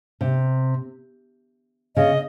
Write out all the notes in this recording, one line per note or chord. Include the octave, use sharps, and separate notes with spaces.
C3
C#3 D#5